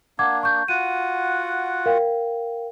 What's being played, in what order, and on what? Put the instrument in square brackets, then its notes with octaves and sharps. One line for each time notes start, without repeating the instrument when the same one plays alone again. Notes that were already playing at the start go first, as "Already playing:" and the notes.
[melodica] A#3 D4 [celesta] F#5 D6 G#6
[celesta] C#6 G6
[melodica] F4 F#4 F#5 [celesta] D#7
[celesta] A#4 F5 G5